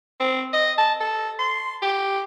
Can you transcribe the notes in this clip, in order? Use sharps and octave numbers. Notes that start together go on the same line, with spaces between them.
C4
D#5
A5
A4
C6
G4